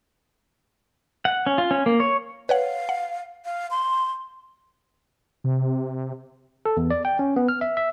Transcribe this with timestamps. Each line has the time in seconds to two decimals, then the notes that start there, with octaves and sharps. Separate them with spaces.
1.25 F#5
1.46 C#4
1.58 F4
1.71 C#4
1.86 A#3
2.00 C#5
2.49 B4 C#5 F5 F#5
2.89 F#5
3.45 F5
3.71 C6
5.44 C3
6.65 A4
6.77 E2
6.91 D5
7.05 G5
7.19 C#4
7.36 B3
7.49 F6
7.61 E5
7.77 E5